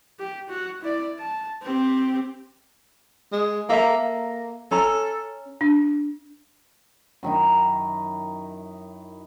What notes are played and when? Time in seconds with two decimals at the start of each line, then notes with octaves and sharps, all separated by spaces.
0.19 G4
0.49 F#4
0.81 E4 D5
1.19 A5
1.63 C4 G4
3.33 G#3
3.69 A#3 A4 E5 A#5
3.97 A#3
4.71 C#4 A4 A#5
5.61 D4
7.23 F#2 D#3 D#4 E4